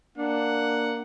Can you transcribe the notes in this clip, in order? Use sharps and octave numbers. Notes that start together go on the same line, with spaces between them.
A#3 D4 F#5